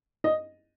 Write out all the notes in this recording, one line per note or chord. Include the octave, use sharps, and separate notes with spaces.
D#5